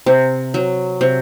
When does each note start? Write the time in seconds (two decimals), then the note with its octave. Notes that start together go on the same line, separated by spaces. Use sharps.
0.06 C3
0.54 F#3
1.01 C3